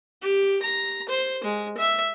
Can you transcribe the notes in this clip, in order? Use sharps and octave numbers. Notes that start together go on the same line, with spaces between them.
G4
A#5
C5
G#3
E5